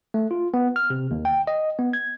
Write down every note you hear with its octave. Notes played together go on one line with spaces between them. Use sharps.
A3
F4
B3
F6
C3
D#2
G5
D#5
B3
G#6